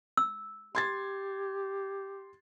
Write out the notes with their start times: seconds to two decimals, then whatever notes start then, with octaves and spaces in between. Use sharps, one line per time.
0.17 E6
0.75 G4 C6 G#6 A6